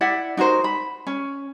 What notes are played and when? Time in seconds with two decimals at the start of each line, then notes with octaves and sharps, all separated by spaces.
0.01 E4 D5 E5 F#5
0.37 D#4 F#4 A#4 C5
0.64 B5
1.07 C#4